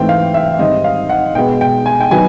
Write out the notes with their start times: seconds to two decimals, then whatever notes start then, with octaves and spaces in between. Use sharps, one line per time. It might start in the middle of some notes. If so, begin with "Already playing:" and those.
Already playing: G#2 E3 A3 C4 G5
0.09 F5
0.34 E5
0.59 G#2 D#3 G3 C4 D#5
0.84 F5
1.09 F#5
1.35 B2 G#3 B3 G5
1.61 G5
1.86 G#5
2.00 G5
2.11 D#3 F#3 B3 G#5